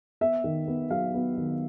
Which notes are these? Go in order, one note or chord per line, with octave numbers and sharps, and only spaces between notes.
B3 E5
D#3
B3
F#3 F5
B3
D#3